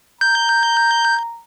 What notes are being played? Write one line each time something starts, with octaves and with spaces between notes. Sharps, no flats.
A#5 G6